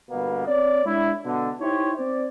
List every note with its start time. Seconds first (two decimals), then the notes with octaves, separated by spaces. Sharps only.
0.11 G1 B2 A#3 B3
0.47 C4 C#5 D5
0.85 G#3 D4 E4
1.25 B2 D3
1.60 D#4 E4 G4 C5 C#5
1.97 C4 C5 D5